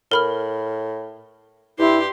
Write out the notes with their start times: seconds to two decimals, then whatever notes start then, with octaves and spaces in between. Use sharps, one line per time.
0.12 A2 A#4 B5 F6
1.79 G2 E4 G4 C6